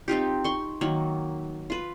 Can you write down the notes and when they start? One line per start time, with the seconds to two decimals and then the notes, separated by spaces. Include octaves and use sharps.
0.08 C4 D#4 F4 G4
0.44 C6 C#6
0.81 D#3 F#3 A#3
1.70 F4 B4